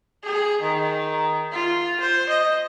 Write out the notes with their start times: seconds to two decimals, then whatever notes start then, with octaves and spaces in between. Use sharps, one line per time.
0.23 G#4
0.61 D#3
1.52 F4
2.00 C5
2.29 D#5